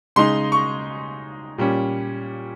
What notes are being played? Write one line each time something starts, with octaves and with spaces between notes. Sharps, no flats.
C#3 G#3 D#4 C6
C#6
A#2 G3 C#4